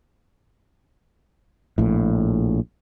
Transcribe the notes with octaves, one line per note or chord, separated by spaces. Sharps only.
A#1 A2